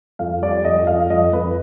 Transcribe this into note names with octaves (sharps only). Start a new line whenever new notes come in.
F2 F5
G3 D5
F2 D#5
D#5
F2 F5
F2 D#5
F2 B4